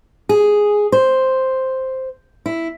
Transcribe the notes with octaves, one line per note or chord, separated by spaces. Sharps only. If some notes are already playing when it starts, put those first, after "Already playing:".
G#4
C5
E4